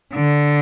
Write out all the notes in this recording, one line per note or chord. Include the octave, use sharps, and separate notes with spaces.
D3